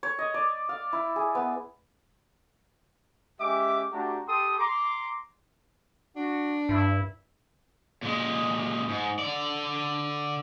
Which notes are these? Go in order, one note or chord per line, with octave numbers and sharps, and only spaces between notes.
C#5
D#5
D5
F5
E4
G#4
B3
G#3 C#4 G4 E5 D6
A3 D4 F#4 G4 A#5
G4 A4 G5 C6 D#6
A#5 C6 D6
D4 F#4
G2 E4
A#2 G#3
G#2
D3 D5